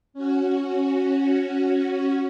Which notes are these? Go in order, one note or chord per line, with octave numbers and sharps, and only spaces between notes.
C#4 F#4